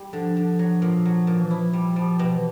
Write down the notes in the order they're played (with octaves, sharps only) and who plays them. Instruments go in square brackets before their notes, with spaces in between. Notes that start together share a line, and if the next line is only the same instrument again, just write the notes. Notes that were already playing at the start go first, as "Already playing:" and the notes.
Already playing: [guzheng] G3
[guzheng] D3 [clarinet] F3
[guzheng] D3
F#3
A#2
F#3
A#2
[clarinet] E3
[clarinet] F3 [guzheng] E4
[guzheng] G3
[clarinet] F3 [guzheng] G3
[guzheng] B2
[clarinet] E3